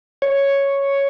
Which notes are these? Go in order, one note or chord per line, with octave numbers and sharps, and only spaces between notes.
C#5